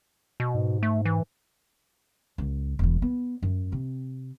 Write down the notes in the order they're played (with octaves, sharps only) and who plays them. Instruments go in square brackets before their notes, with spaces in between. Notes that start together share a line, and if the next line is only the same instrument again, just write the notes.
[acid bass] B2
[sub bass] G#2
[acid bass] A3
E3
[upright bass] C#2
E1 E3
B3
F#2
C3 C4